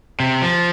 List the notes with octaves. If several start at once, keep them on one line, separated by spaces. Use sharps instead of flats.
C3
F3